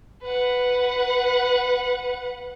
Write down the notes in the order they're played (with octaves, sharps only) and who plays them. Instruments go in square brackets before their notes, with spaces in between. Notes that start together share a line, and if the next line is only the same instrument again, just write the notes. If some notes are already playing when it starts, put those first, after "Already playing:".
[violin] B4 F#5